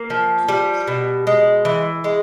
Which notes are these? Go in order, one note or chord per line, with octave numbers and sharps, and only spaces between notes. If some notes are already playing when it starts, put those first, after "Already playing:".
Already playing: A#3
F3
G3
B2
G#3
E3
G#3